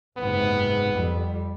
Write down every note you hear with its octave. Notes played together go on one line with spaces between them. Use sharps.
F#1 G#2 C3 B3
F2 G3